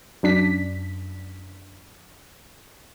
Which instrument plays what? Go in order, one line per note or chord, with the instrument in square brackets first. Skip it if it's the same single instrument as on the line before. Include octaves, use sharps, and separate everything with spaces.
[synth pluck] F#2 D4 B6